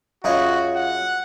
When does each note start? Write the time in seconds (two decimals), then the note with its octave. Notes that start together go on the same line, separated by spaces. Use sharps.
0.24 F#2 F4 F#4 G#4 C#5 D#5 F5
0.76 F#5